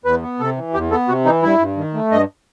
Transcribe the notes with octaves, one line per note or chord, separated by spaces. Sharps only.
E2 B4
B3
C3 A4
E3
E2 G4
B3 A4
C3 F#4
E3 D#4
G2 E4
G2
D#3
A3
G2 D#5